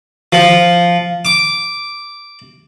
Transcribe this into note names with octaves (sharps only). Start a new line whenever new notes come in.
F3
D6